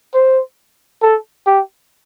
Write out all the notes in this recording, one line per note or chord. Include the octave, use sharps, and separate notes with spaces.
C5
A4
G4